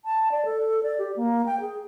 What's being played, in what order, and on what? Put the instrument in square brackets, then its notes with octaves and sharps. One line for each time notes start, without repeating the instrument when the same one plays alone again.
[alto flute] A5
D5
A4
D5
G4
A#3
G5
G#4